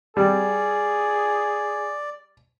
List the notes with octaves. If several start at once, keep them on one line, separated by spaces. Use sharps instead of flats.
G3 G#4 D5